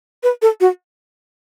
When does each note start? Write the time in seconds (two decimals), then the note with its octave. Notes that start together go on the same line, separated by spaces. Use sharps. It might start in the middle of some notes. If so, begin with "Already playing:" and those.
0.23 B4
0.42 A4
0.60 F#4